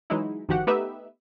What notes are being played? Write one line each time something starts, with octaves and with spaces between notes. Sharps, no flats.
E3 F#3 G#3 D#4 E4
G1 D#3 F3 F#4 G4 F#5
A3 B3 D#4 G4 B4 E5